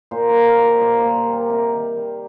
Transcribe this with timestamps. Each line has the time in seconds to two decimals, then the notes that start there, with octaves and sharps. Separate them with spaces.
0.11 A#2 C5
0.29 A#4
0.34 G3
0.46 A#4
0.58 A#3
0.63 C5
0.81 A#2 D5
0.98 C5
1.04 A#2
1.15 G4
1.27 G3
1.33 A#4
1.50 C3 A#4
1.74 D#3
1.97 G3